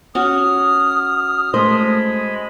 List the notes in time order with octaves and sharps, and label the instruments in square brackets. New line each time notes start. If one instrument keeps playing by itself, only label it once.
[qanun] C#4 F#4 [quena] D#6 [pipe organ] F6
[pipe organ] G#3 D#5 B5 [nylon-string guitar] A3 C5